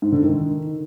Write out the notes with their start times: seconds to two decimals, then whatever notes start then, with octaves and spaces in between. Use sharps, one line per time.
0.02 G#2
0.12 D3
0.23 D#3